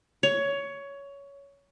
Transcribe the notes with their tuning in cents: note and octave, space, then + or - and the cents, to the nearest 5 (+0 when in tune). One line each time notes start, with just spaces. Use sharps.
C#5 +15